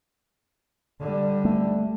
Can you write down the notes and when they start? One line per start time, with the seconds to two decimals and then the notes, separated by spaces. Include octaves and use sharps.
1.00 D3 G3
1.45 A3